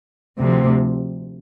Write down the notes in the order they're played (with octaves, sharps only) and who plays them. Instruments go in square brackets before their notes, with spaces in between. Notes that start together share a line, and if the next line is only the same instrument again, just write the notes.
[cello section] D2 C3 F3